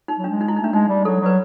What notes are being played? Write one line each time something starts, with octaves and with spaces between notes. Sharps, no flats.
D#4
F#3
D4
G#3
D#4
E4
D#4
A3 D4
G#3 D#4
G3
F#3 A4
F#3 B4